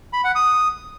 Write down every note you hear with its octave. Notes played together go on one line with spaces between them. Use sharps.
B5
F#5
D#6